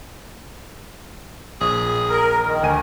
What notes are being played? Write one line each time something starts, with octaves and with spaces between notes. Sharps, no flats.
A#1 G#4
A#4
D#3
D2 G#5 D#7